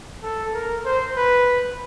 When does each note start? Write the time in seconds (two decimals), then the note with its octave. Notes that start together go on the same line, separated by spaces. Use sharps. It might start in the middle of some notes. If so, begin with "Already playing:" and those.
0.23 A4
0.54 A#4
0.85 C5
1.16 B4